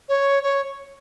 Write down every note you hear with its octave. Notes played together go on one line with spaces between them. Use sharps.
C#5
C#5